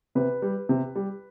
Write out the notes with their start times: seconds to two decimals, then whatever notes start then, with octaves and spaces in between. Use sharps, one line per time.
0.15 C3 B4
0.42 G3
0.69 C3
0.95 G3